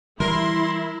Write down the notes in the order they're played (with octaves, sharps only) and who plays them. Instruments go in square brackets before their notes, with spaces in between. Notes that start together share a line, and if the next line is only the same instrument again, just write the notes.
[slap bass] E3 G3 [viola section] E4 [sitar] A#4 [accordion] C6